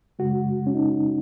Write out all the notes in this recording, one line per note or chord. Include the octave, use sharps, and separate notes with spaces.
F#2 C#3 G#3 F#4
C#4
D#4